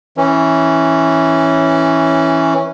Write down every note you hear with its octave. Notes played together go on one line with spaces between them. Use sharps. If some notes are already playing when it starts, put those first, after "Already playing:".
E3 C#4